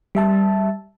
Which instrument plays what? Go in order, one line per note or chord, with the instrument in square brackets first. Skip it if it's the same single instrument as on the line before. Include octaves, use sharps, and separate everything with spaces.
[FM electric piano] G3 E5 A5